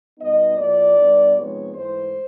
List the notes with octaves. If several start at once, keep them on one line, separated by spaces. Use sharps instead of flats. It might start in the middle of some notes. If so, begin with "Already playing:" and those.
B2 G3 B3 D#4 D#5
A2 F3 A#3 D5
B2 G3 B3 D4
C3 F3 G#3 B3 D#4 C#5
G#2 E3 A3 C5